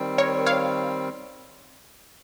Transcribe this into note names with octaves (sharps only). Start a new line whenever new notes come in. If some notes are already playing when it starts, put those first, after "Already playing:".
Already playing: D#3 G3 C4
A#4 C#5
C#5 F5